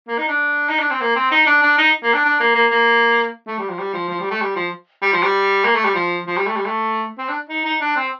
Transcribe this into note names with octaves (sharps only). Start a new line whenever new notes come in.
A#3
D#4
D4
D#4
D4
C4
A#3
C4
D#4
D4
D4
D#4
A#3
D4
D4
A#3
A#3
A#3
A3
G3
F3
G3
F3
F3
G3
A3
G3
F3
G3
F3
G3
A#3
A3
G3
F3
F3
G3
A3
G3
A3
C4
D4
D#4
D#4
D4
C4